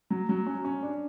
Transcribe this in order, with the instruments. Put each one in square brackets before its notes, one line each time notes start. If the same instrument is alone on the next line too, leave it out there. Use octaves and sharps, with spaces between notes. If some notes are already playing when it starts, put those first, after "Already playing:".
[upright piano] F#3
F#3
C#4
C#4
D4